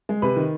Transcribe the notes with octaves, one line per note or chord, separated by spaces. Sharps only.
G#3
C3 B4 B5
D#3